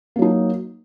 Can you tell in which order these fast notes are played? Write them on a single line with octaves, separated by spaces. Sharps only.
A#3 F#3 D#4